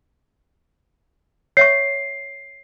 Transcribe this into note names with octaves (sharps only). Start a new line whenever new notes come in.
C#5 E5 C#6 C7